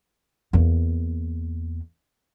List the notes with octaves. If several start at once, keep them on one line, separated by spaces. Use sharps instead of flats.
E2 A#3